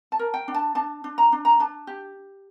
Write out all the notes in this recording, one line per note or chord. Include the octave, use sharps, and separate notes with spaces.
A5
A#4
G5
D4
A5
D4 A5
D4
A#5
D4
A#5
D4 A5
G4